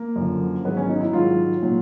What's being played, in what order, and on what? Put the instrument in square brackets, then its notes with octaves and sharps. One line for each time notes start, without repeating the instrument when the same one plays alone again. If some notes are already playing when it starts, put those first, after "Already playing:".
Already playing: [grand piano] A#3
F#2 D3 F3
G#2 D#3 F#3 B3
C#4
D#4
E4
G#2 D#3 F#3 F4
A#2 F#3